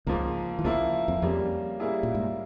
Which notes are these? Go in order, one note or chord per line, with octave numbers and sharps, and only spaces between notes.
C#2 G#2 C#3 F3 A#3
E3
C#2 C#3 F3 A#3 E4
F2
F2 C#3 G3 A#3
C#3 G3 A#3 E4 G#4
A#2
G#2